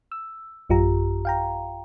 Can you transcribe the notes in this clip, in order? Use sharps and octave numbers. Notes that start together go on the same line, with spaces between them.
E6
A1 F#2 F4 G4 A#5
F5 G5 A#5